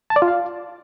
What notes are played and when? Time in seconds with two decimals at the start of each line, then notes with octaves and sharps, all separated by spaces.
0.10 A5
0.16 D5
0.22 F4
0.28 F5